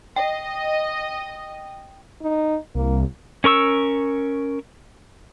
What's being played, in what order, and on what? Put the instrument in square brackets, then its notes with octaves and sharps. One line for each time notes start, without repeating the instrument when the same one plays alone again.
[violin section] D#5 [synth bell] G5
[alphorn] D#4
[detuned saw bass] C2 [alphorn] A#3
[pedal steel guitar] C#4 A#4 C#6 E6